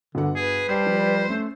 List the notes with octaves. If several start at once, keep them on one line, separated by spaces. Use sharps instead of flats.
G1 D3 F#4 F#5
G#4 B4
G3 C5 A5 C7
F3
A3 C#4